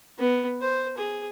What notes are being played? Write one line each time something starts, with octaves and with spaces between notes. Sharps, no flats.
B3
C5
G#4